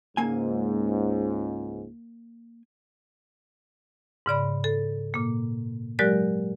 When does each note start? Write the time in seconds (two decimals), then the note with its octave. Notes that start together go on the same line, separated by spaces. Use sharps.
0.17 C#2 G#2 A#3 G#5
4.26 G#2 C#3 D5 B5
4.64 A4
5.14 A#2 A#3
5.99 F#3 G#3 G4 A#4 D5 F#6